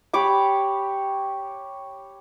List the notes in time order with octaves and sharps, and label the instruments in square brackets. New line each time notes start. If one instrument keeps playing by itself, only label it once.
[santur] G4 C#5 B5 D6